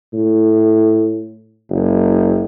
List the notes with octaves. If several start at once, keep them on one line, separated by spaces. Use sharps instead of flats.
A2
F#1